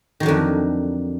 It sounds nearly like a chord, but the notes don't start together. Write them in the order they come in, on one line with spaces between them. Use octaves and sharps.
D#3 F#3 D3 F2